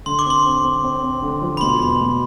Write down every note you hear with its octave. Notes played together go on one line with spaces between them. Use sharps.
D3 C6
D6
C4 C6
C4
C4
C4
C4
D3
F3
B5
B2 C6
E2
B2